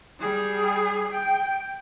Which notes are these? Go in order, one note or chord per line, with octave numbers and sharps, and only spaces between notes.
G3 G#4
G5